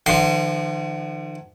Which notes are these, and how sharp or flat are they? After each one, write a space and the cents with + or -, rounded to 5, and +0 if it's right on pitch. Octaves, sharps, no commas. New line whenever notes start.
D3 +45 F3 -40 C6 +0